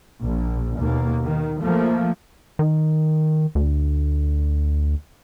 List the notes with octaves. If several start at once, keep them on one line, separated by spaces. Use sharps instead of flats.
A#1
D#2 B2 A#3
D#3
F3 A3 A#3
D#3
D2